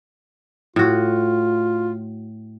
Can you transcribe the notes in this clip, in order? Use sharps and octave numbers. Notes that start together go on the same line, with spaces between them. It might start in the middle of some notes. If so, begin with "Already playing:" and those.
A2 F4 F#4